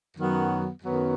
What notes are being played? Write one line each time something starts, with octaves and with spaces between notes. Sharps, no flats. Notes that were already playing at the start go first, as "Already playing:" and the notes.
F#2 D#3 F#3 B3
F#2 D#3 F#3 B3